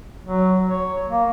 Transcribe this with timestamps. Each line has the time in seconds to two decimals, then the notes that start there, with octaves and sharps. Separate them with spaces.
0.24 F#3
0.68 C#5
1.09 A#3